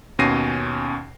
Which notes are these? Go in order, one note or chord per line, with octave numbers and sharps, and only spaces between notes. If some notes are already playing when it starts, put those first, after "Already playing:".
D#2 B2 C#4 A#6 C7 D#7